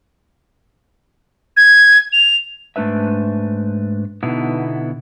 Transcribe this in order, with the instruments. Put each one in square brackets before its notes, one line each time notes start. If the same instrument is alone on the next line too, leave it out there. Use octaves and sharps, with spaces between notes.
[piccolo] G#6
F7
[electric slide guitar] G#2 A3 D4 B4 E5
B2 D3 B3 D#4 E4